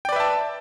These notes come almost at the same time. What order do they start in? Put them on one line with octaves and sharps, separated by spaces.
G5 D5 B4 E5 A5